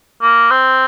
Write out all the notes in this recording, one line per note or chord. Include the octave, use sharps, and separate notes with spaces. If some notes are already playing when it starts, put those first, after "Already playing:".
A#3
C4